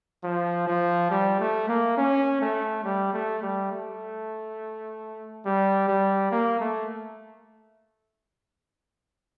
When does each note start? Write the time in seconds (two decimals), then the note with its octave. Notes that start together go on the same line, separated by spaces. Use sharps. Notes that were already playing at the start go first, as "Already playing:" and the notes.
0.24 F3
0.67 F3
1.11 G3
1.40 A3
1.68 A#3
1.97 C#4
2.41 A3
2.84 G3
3.13 A3
3.42 G3
3.72 A3
5.46 G3
5.88 G3
6.32 A#3
6.61 A3